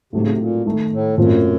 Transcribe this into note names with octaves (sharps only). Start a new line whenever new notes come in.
A2 C3 F#3 A3 C4 D#4
C#3
C3
A#2
D#3 A3 D#4 A4
A2
F#2 A#2 A3 C4 F4